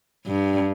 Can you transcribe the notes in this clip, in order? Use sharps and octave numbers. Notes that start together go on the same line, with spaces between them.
G2